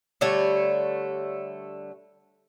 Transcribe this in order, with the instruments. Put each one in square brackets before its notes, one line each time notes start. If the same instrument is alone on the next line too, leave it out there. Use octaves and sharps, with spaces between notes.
[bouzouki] D3 G3 A3 C#5